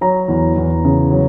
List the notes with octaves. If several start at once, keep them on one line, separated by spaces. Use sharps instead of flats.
F#3 A#5
E2
E2
C#3
F#3